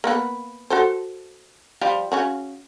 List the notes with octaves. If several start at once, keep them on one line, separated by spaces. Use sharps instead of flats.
A#3 B3 B4
F#4 A4 C5
F3 G3 F5
C#3 C#4 F#4